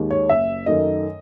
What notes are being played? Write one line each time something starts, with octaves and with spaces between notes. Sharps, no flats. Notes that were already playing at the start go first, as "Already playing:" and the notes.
Already playing: D#2 D#3 G#3
C#5
F#1 E5
F#2 D#3 A3 D#5